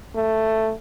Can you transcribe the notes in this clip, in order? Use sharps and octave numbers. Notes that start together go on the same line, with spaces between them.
A3